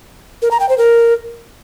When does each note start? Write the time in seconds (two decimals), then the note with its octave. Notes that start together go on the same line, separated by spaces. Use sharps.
0.42 A#4
0.51 A#5
0.60 G5
0.69 C5
0.78 A#4